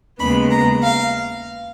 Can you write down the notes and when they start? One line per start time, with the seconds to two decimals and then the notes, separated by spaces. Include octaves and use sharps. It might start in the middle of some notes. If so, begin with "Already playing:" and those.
0.19 D#2 C#3 G#3 B3 B5
0.51 A#5
0.83 F5